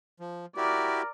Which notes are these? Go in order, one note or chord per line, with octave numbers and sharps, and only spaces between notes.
F3
E4 F#4 G4 A#4 D5